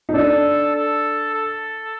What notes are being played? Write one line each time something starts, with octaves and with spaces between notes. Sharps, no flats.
D#4
D4 A4
A4
A4